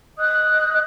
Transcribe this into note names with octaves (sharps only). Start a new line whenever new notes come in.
D#5 D#6 F#6 G6